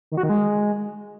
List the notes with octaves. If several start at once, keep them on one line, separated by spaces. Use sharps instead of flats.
D#3
F#4
D#3
G#3